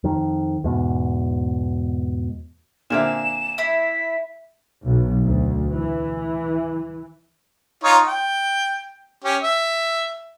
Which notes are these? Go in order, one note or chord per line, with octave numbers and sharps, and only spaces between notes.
F2 D#3
E2 G#2 B2
A#2 D3 C4 E5 F5 G#5 E7
E4 B6
B1
D2
E3
D#4 F4 C#5
G5
C#4 G4
E5